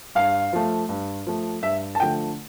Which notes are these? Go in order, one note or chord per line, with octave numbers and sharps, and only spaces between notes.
G2 F5
F3 A3
G2
F3 A3
G2 E5
A5
D3 F3 A3 G5